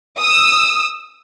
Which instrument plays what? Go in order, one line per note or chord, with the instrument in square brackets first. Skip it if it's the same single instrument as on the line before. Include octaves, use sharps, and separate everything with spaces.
[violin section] D#6 E6